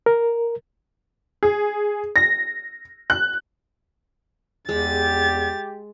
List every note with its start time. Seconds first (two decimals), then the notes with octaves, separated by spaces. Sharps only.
0.06 A#4
1.43 G#4
2.16 A#6
3.10 F#6
4.69 E2 G#3 G4 A6